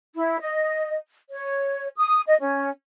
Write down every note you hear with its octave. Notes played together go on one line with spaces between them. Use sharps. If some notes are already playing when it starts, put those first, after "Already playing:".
E4
D#5
C#5
D#6
D#5
C#4